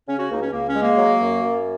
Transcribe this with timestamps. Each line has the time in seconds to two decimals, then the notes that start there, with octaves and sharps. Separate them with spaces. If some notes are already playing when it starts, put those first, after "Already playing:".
0.08 C#3 C#4
0.19 C#4 F#4
0.30 C#2 A#3 D#4
0.41 C#4
0.52 C#2 A#3
0.68 C#4
0.75 G#3
0.82 A#3
0.97 F#3
1.20 F#2
1.42 F#2